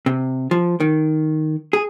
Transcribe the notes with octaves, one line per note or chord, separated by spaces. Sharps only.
C3
F3
D#3
G#4